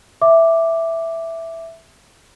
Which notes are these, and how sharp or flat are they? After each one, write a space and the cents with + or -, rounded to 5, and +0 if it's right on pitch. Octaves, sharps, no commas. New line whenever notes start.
E5 +0 D6 +0